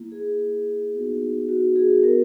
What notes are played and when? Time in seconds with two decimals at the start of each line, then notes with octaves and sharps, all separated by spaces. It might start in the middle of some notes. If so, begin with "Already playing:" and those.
Already playing: A#3 E4
0.12 G#4
0.94 B3 D#4 F#4
1.49 F#4
1.76 G#4
2.03 B3 F#4 A#4